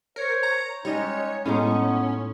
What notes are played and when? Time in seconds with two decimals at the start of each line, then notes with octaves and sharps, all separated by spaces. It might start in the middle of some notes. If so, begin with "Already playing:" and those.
0.16 A#4 C5 C#5
0.43 A#5
0.85 G3 G#3 C#4 D#4 C#5 D#5
1.45 A2 G#3 B3 C#4 D#4